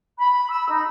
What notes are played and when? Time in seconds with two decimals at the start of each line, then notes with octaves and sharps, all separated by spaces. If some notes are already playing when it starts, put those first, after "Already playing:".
0.18 B5
0.50 E6
0.69 D#4